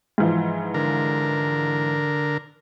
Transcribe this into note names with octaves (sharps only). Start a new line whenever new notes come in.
G#2 E3 F3
D3 A#4